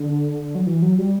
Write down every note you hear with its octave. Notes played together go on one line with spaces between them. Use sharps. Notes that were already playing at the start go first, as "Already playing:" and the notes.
Already playing: D3
F#3
E3
F#3
G3